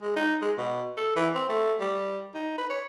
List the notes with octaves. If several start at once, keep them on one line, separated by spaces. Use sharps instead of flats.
G#3
D#4
G#3
B2
A4
E3
C4
A3
G3
D#4
B4
C#5